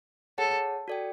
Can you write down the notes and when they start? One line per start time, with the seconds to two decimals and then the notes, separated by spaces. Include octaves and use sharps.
0.38 G#4 A4 C#5 F#5 A5
0.88 F#4 A4 D5 G5